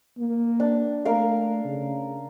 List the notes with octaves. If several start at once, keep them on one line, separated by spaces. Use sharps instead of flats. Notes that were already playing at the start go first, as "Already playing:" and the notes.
A#3
D4
A3 A#4 F5
C#3